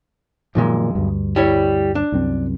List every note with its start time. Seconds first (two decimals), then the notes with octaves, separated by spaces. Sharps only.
0.55 B1 F#2 A#2 D#3 F3 G#3
0.95 D2 G2
1.36 G3 E4 C#5
1.95 D4
2.12 C2 F#2 C4